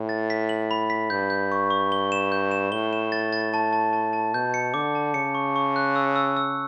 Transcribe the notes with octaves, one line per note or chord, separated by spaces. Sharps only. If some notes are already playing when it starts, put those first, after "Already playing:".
Already playing: A2
A6
B6
F#7
B5
B6
G2 G6
G6
C#6
C#6
G7
E7
G6
E7
A2 G7
E7
A6
A6
A5
A5
A5
A5
B2 G6
C#7
D3 D6
A5
C#3 C#7
C#6
C#6
F#6
E6
E6
E6